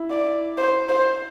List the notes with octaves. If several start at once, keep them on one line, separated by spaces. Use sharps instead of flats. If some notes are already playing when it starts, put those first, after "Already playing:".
Already playing: E4
D5
C5
C5